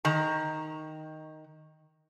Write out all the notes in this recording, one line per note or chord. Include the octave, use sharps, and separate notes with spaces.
D#3 A#5